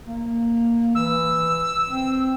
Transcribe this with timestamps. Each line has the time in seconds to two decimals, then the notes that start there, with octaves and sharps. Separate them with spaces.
0.08 A#3
0.95 E3 E6
1.90 C4